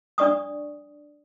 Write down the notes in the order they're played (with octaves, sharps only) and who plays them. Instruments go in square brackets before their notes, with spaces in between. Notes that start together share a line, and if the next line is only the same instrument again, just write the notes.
[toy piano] D4 D5 C#6 D#6